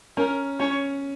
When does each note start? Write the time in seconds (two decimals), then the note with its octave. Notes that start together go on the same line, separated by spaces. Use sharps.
0.17 C#4 A#4
0.60 C#4 C#5